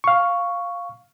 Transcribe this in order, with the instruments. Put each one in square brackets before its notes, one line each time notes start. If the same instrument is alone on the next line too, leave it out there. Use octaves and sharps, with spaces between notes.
[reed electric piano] F5 C#6